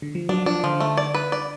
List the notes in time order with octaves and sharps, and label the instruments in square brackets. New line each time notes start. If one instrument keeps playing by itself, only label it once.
[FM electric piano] D3
F3
[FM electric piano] F#3 [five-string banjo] D4
[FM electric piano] F3 [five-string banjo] D4
[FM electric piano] D3 [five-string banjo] F3
[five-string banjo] A3
D5
B4
D5